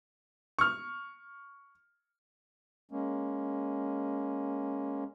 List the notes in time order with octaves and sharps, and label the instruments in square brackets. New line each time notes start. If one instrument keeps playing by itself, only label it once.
[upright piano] C#6 F6
[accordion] G#3 A#3 C#4